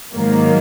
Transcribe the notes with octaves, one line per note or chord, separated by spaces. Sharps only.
G#2 D#3 F#3 A#3